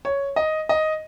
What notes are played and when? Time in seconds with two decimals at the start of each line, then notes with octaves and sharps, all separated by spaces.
0.05 C#5
0.36 D#5
0.69 D#5